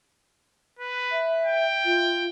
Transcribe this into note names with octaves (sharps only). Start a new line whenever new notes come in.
B4
E5
G5
F4